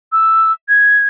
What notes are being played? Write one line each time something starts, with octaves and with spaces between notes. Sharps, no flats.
E6
G#6